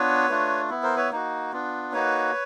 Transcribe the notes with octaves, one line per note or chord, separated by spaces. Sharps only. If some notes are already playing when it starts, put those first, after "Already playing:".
Already playing: B3 D4 F4 B4 C#5
A3 D4 F4
B3 E4
A#4 C5
B4 C#5
A#3 D#4 F#4
B3 D4 F4
A#3 D#4 F#4 B4 C#5